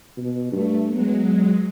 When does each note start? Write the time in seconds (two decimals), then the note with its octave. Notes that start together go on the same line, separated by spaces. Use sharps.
0.17 B2
0.52 G2 A3
0.90 F#3 G#3 B3